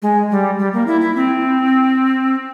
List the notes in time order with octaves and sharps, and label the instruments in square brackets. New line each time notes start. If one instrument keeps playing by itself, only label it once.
[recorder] G#3
G3
G3
A#3
E4
E4
C4